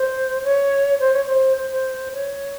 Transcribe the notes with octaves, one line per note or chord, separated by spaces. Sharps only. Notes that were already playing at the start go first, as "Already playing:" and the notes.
Already playing: C5
C#5
C5
C#5
C5
C5
C5
C#5